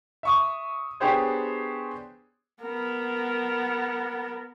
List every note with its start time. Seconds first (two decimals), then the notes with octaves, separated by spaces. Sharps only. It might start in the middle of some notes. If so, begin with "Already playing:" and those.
0.23 E5 C#6 D#6
1.00 B3 D4 G4 G#4 C5 C#5
2.62 B3 A#4